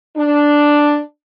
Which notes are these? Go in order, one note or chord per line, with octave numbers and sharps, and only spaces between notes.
D4